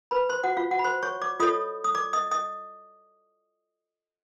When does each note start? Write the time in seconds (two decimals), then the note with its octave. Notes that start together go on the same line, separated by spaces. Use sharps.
0.11 B4 B5
0.29 C5 C6
0.43 F#4 F#5
0.57 F4 F5
0.71 F#4 F#5
0.79 B5
0.84 C5 C6
1.03 C#5 C#6
1.22 D5 D6
1.40 F4 A4 C#5 D#5 D#6
1.84 D#6
1.95 D5 D6
2.13 D#5 D#6
2.31 D#5 D#6